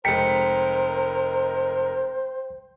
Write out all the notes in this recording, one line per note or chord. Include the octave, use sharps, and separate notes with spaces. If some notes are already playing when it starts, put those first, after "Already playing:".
F1 G#3 A#4 C5 G5 B6 C#7